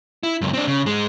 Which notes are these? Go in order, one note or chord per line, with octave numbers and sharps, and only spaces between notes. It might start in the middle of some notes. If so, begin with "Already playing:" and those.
E4
C#2 F#2
C4 D4
C#3
G#2 G#3